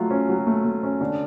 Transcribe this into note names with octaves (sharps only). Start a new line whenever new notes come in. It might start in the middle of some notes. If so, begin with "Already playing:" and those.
Already playing: F#3 A3 F4
C#4
F#3
A3
A3
C#4
D3